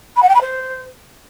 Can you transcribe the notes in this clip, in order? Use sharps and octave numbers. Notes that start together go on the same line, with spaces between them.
B5
F#5
G5
B5
C5